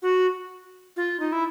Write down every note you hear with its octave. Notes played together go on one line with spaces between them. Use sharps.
F#4
F4
D#4
E4